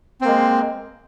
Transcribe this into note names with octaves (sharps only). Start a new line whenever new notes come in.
G#3 A#3 C4